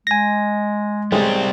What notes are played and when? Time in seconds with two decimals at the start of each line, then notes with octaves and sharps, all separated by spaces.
0.07 G#3 G#5 A#6
1.12 A1 G3 G#3 C4 C#5